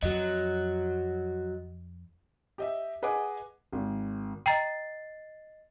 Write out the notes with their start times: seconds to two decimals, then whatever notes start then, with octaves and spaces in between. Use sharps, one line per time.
0.03 F2 F#3 F#4 D#5
2.58 G4 D#5 E5
3.02 G#4 B4 D#5 F#5 G#5 D6
3.73 G#1
4.46 D#5 G5 A#5 A6 C7